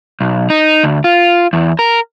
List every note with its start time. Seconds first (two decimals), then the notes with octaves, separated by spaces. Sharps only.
0.21 B1
0.50 D#4
0.83 D2
1.04 F4
1.53 E2
1.79 A#4